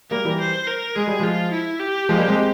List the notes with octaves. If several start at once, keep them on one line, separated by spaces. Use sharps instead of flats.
G3 A#3 A#4
E3 G3
C5
A#4
G#3 G#4
G3
F3 G#3 F4
E4
G4
F3 G#3
G3 A#3
G#3 C4